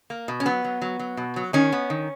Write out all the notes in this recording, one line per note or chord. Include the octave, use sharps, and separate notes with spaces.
A#3
B2
C#4
F#3 B3
F#3
F#3
F#3
B2
F#3
D#3 C#4
B3
D#3